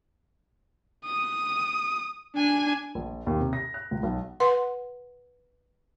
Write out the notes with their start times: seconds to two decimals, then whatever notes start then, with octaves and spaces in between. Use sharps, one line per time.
1.05 D#6
2.36 D4 G#5
2.95 A#1
3.27 D#2
3.40 C3
3.53 A#6
3.74 F#6
3.91 C#2
4.03 B1
4.40 B4 F#5 C6